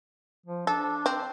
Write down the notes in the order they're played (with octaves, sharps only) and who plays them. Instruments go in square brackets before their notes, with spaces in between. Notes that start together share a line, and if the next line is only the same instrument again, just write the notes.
[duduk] F3
[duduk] D4 [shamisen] A4
[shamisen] C4